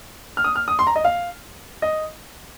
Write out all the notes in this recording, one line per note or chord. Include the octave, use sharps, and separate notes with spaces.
F6
D#6
F6
D#6
C6
A#5
D#5
F5
D#5